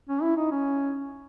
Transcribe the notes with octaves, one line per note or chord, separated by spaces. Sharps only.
C#4
E4
D#4
C#4